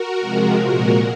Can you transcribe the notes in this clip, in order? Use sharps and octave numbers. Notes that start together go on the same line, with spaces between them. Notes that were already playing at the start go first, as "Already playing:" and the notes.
Already playing: F#4 A#4
C3 F3 G#3
A#2 G#3 F#4 A#4